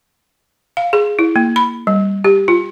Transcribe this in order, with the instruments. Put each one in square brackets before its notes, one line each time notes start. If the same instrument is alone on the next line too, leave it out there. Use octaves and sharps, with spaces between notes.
[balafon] F5
G#4
E4
A#3
B5
G3
G4
F4